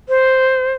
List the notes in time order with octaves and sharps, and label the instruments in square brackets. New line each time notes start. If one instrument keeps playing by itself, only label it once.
[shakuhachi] C5